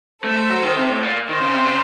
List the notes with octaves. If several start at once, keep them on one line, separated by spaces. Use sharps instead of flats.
A3 A4 C5
A3
F#3
D#3
C3
A2
A#2
D#3 C5 D#5
C#3
C3
C#3